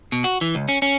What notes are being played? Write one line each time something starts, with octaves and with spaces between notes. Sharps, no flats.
B2
F#4
E3
C#2
C#4
C#4